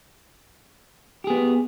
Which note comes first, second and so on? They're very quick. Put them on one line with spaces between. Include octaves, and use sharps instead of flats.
G4 G#4 B3